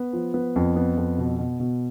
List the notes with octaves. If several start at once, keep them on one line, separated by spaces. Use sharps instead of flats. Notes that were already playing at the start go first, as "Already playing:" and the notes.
Already playing: B3
F3
B3
F2
B3
F2
B2
B2
B2